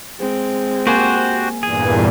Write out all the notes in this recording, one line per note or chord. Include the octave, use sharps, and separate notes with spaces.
G#3 C4
A#3 F#4 G4 C5 G#5
E2 G2 A#2 G#4